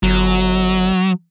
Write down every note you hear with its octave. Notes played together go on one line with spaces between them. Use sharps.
G1 F#3